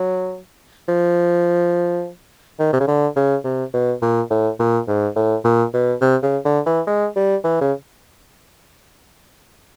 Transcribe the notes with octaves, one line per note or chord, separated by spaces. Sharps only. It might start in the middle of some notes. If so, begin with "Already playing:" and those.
Already playing: F#3
F3
D#3
C3
C#3
D3
C#3
C3
B2
A#2
A2
A#2
G#2
A2
A#2
B2
C3
C#3
D3
E3
G#3
G3
E3
C#3